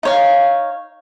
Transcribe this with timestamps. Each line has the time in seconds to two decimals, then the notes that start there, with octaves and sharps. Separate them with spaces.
0.03 D#4 C#5 F5